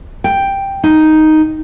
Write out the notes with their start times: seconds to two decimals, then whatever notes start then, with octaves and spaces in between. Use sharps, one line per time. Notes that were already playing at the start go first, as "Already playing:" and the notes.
0.24 G5
0.84 D#4